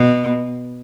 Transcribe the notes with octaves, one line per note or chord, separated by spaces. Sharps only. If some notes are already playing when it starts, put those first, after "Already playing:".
Already playing: B2